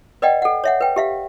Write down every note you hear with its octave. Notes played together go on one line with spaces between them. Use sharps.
B4 D5 D#5 F#5 G5
A4 F#5
C#5 E5 F#5
B4 G5
G4 E5 F5